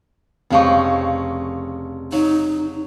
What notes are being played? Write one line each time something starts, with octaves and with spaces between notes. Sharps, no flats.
F1 C#3 F3 D#4 C#6
F#3 D#4